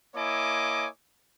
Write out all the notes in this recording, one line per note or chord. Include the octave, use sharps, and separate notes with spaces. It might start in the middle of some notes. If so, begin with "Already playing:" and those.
A#3 E4 C#5 D#5 G#5 D6